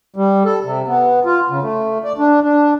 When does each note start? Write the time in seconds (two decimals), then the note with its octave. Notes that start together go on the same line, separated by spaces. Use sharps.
0.16 G3
0.45 A4
0.64 C3
0.87 B3
1.25 F4
1.50 C#3
1.62 A3
2.04 D5
2.18 D4
2.43 D4